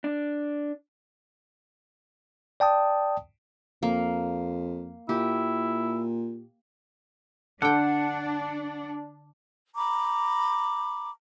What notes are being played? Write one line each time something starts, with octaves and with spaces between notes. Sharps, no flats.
D4
D5 G5 A5 D#6
F2 A#3
A#2 E4 G4
D3 D4 F#5 G5
A#5 B5 D6